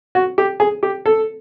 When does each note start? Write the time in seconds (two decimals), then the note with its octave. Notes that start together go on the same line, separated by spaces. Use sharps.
0.15 F#4
0.38 G4
0.60 G#4
0.83 G4
1.06 A4